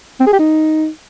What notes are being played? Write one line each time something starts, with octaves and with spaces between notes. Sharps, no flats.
C4
G#4
G4
D#4